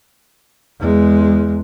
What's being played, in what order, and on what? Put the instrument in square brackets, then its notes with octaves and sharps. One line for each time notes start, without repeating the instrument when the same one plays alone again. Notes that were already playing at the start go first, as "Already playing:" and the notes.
[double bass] E2 G#3